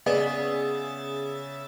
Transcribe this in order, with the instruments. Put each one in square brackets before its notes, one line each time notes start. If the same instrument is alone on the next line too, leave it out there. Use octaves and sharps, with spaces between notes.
[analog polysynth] C#3 E5 A6 [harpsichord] B3 [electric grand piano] G#4 [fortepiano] D5